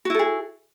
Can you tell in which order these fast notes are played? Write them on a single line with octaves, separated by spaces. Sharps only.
F#4 E4 A4 G#4